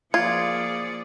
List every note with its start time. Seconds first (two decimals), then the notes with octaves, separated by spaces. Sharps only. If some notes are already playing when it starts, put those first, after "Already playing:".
0.14 F3 A#3 F4 G#4 D5 G#6 C#7